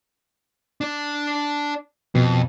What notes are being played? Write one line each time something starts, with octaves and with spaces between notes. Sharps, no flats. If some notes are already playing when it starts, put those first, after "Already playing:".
D4 D5
F2 B2